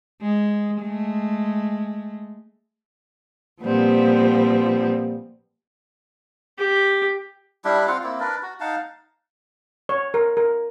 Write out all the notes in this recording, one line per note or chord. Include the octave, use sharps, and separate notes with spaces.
G#3
G#3 A3
A#2 F3 G3 B3 C4
G4
G3 D4 E4 G4
C4 F4 F5 F#5
A#3 C4 E4
D4 A#4 B4 D5
F#4
D#4 F5 F#5 A5
C#5
A#4
A#4